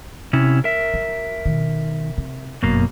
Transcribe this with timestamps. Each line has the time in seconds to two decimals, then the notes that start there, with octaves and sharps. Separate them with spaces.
0.33 C3 C#4 E4
0.64 A#4 E5
0.94 F#3
1.46 B2 D#3
2.18 C3
2.63 G1 F#2 B2 A#3